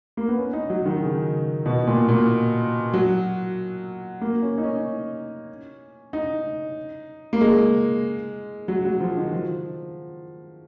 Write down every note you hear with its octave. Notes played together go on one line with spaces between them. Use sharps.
A#3
B3
C#4
D#4
F#3
D#3
C#3
B2
A#2
A#2
F#3
A#3
C#4
D#4
C#4
D#4
A#3
G#3
F#3
F#3
F3
D#3
F3